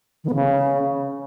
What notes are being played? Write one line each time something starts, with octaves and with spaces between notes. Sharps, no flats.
D#3
B3
C#3